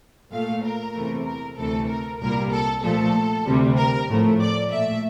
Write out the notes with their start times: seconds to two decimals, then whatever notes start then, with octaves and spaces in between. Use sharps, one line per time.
0.31 A#2 A3 F5
0.63 A#4
0.94 E2 C3 E3 A3
1.25 A#4
1.57 D2 C3 E3 A3 A4
1.88 A#4
2.20 C2 A#2 G3 A#3 A#4
2.51 A4
2.83 A#2 F3 A3 A4
3.46 D2 C3 G3
3.77 A#4
4.08 A2 F3 A3
4.40 D5
4.71 A#2 A3 E5